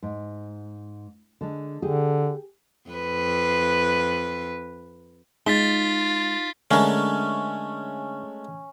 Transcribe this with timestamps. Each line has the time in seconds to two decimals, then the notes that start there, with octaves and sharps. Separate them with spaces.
0.03 G#2
1.41 D3 G#3
1.82 D3 G4 G#4
2.90 F2 B4
5.46 G#3 D#4 F4 A6 B6 G7
6.71 D3 G#3 A3 C#4 A#4